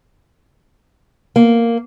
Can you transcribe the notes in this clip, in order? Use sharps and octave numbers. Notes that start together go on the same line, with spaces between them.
A#3